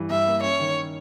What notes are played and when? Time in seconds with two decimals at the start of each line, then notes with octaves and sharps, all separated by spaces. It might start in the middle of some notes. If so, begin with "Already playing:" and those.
Already playing: G2 E3
0.10 G2 E5
0.27 A#3
0.43 C#4 C#5
0.60 D#3